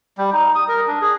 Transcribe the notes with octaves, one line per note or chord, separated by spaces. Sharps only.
G3
D#4
D#6
A#4
D4
G#4